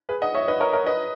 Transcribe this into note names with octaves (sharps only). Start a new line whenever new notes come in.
G#4 B4
D#5 F#5
C#5 E5
B4 D#5
A#4 C#5
A#4 C#5
B4 D#5